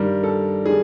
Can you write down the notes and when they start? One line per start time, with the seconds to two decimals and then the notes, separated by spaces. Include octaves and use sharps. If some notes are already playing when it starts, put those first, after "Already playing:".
Already playing: G2 D#3 G3 A#4
0.24 A4
0.66 D#3 G3 G#4